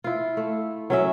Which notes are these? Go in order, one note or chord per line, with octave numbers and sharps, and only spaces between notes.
E4 F4
A3
F#3 C#4 E5